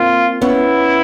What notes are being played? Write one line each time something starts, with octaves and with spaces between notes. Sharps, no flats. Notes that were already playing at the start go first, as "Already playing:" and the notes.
Already playing: A#3 C4 F4
B3 C#4 E4